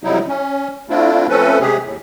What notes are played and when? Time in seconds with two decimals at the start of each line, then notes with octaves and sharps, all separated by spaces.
0.04 F2 C3 F#3 G3 D#4 E4
0.28 C#4
0.89 A3 C4 D4 E4 F4
1.29 F3 A3 C4 C#4 A4 B4
1.60 C3 G#3 G4 G#4
1.83 D#2 A2